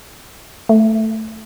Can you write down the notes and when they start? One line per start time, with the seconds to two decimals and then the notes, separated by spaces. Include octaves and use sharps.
0.69 A3